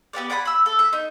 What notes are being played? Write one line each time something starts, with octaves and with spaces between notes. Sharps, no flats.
B3 G4 B4 D5
D5 F#5 G#5 B5
B5 E6
A4
E5
D#4